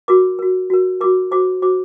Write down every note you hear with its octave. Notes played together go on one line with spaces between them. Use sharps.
F#4 A#4 D6
F#4 A#4
F#4 A#4
F#4 A#4 D6
F#4 C5 D6
F#4 C5 D6